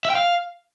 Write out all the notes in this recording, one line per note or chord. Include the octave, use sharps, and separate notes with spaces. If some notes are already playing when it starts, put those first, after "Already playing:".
E5
G5
F5